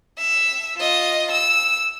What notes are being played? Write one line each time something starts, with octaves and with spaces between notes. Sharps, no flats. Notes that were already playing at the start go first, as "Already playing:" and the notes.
E5
F4 D#5
E6